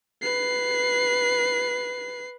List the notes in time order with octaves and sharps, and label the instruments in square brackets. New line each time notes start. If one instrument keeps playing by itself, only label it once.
[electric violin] B4 C7